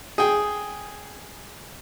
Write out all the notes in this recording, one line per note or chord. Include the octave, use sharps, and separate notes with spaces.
G#4 G5